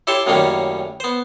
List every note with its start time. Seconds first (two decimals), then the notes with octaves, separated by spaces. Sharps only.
0.07 E4 G4 A4 C#5 A5 C6
0.27 F#2 A2 D#3 G3 A#3 C#4
1.00 B3 C5